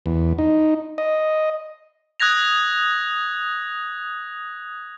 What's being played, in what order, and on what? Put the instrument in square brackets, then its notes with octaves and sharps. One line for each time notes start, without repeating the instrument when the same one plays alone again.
[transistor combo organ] E2
D#4
D#5
[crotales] D#6 F#6 G#6 A#6 F7